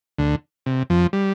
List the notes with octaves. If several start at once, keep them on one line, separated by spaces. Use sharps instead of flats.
D2 D3
C3
F2 F3
G3